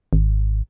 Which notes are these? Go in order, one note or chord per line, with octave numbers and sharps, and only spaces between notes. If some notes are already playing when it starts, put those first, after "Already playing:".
G#1